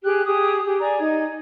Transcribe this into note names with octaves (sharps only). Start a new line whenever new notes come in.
G4 G#4 G5 F#6
G4 G#4 D#6
G4 G#4
D5 G#5 A#5
D#4 G#6